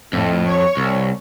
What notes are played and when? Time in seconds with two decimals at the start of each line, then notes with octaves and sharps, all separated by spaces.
0.13 F2 A2
0.47 C#5
0.77 C2